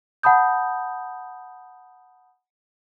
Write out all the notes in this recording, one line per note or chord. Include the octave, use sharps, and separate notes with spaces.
F#5 A5 B5 D#6 G6